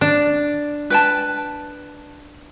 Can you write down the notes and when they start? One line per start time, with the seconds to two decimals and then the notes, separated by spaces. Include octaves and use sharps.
0.01 D4
0.90 B4 G5 A5